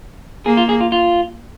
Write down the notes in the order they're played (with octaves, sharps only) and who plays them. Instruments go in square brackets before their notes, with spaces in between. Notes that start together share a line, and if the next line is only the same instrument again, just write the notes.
[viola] A#3 [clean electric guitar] G#4
[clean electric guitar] F4
G#4
F4
F4